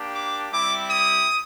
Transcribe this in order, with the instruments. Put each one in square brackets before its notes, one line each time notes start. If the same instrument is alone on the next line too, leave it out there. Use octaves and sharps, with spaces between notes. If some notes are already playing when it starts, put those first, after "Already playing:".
Already playing: [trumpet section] A#3 D4 G4
D6
G3 C4 E4 G4 D6
D#6